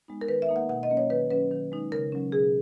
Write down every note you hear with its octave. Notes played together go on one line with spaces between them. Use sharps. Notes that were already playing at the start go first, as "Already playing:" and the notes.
G#3 B3 D#4
A#4
D#3 B4
E5
A#3 D#4
F#5
B2 F#5
D#5
F#3 A#3 C#4
C#5
D#3 B4
F#3 C#4 B4
D#3
G#3 D#4
C#3 A#4
F#3 C#4
B2 G#4